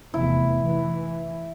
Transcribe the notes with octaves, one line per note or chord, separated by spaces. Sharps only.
F1 E2 E4
E3